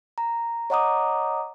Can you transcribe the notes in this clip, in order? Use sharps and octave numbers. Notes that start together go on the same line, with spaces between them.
A#5
C#5 D#5 F#5 A#5 D6 D#6